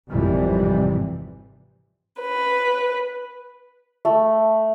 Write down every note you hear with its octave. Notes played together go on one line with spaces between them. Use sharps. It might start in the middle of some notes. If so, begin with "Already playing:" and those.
G#1 F2 C3 E3 G3
B4
A3